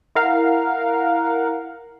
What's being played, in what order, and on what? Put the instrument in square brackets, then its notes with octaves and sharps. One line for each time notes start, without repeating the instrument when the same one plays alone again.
[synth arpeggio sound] E4 A#4 F5 F#5